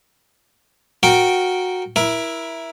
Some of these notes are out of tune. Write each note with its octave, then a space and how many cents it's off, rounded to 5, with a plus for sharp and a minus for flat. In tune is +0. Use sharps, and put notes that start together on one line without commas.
F#4 -15 A#4 +0 G5 -10
E4 +0 A#4 +25